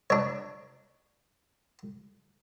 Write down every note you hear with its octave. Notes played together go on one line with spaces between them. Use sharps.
D4 C#5